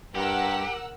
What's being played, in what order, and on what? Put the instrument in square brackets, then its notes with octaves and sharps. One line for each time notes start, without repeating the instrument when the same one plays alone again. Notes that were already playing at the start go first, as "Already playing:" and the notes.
[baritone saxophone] G2 [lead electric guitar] G4 [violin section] A#4 F#5 E6